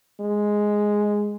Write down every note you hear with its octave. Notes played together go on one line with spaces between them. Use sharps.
G#3